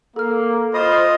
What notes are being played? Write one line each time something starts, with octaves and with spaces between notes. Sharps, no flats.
A#3 A4 F6
F4 C5 D#5 B5 D#6